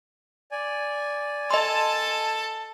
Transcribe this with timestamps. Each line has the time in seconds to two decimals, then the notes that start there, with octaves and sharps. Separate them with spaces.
0.51 D5 G#5
1.51 A4 D#5 G#5 A5 C6